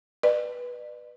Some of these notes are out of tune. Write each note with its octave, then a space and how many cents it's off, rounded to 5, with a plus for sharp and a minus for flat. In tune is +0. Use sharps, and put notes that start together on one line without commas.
B4 -10 D5 +40